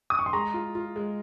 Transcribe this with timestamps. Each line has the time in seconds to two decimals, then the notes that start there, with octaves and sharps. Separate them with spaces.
0.10 D#6
0.19 C#6
0.26 C6
0.33 G#3 A#5
0.54 F4
0.75 F4
0.96 G#3